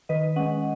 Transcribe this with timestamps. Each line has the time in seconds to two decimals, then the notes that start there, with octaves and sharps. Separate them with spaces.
0.09 D#3 B4 D#5
0.36 G#3 C#4 D#5 F#5